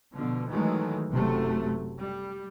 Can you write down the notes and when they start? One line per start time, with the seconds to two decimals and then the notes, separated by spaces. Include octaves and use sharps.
0.13 B2 D3 F3
0.47 D#3 E3 F#3 G#3 A3
1.11 F#1 C3 F#3 A3
1.98 G3